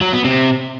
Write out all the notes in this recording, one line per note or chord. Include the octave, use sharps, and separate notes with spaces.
F#3
B3
C3